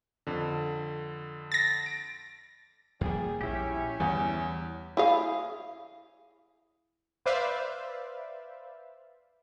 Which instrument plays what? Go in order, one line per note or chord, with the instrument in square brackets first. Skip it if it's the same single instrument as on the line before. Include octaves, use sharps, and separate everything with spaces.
[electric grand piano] F2 D3
[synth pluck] A6 A#6
[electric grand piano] D7
[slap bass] E2 F3 A#3 [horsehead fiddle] G3 G#4
[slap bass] A#1 [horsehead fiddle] C#4 [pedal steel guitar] E4 G4
[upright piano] E2 [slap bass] G3
[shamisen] E4 G#4 F5
[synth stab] B4 C5 D5 E5 F5